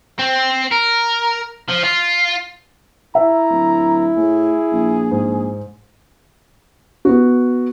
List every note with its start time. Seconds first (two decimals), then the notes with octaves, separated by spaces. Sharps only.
0.19 C4
0.71 A#4
1.68 F3
1.83 F4
3.15 E4 E5 A#5
3.50 D1
4.17 A2 G#4
4.72 A#1
5.11 G#2
7.05 B3 F#4